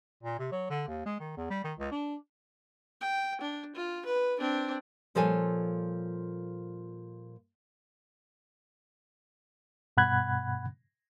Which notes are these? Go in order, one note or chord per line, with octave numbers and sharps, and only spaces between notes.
A#2
C3
F#3
D3
D#2
G#3
D#3
E2
G3
D#3
C#2
D4
G5
D4
F4
B4
C4 D4
A#2 F3 G3 A4 C#5 G#5
G2 B2 F#5 B5 F#6 G#6